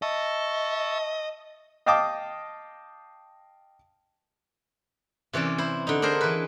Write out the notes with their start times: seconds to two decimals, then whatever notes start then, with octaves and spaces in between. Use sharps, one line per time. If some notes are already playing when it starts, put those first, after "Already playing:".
0.02 D#5 E5 A5 C#6
1.86 D#5 F5 G5 A5 D6 D#6
5.33 C3 E3 C#4 D5
5.58 E4 C5
5.87 D3 D#4
6.02 D4 G#4 A#4 C5
6.21 E3 B4